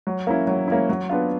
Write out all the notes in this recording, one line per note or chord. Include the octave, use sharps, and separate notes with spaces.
F#3
A#3 C#4 E4
F#3
A#3 C#4 E4
F#3
B3 D4 F4